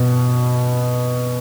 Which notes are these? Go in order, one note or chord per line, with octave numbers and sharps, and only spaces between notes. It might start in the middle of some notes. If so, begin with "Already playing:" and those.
Already playing: B2